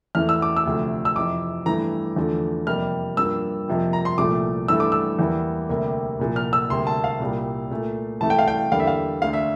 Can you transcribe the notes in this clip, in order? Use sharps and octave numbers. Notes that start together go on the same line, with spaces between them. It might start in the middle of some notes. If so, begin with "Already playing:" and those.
E2 E3 A3 F6
E6
D6
E6
D2 C3 F3 A3
E6
F2 C3 E3 D6
G2 E3 A3 A#5
E2 D3 F3 A3
F2 C3 G3 A#3 F6
G2 F3 A#3 E6
F2 C3 F3 A#3
A#5
C6
C2 A#2 F3 A3 D6
G2 E3 A3 E6
D6
E6
E2 E3 G3 A#3
D2 C3 G3 A#3
C2 A#2 F3
F6
E6
D2 C3 G3 A#3 C6
A5
F5
C2 A#2 G3 A#3
A#2 A3
C2 C3 E3 A3 A5
G5
F5
G5
E2 D3 G3 A#3 F5
E5
F5
D2 D3 A3 F5
E5